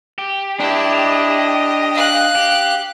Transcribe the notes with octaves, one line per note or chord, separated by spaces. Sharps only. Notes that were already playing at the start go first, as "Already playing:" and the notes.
G4
D4 E4 D#5 G5
F5 F#6
G4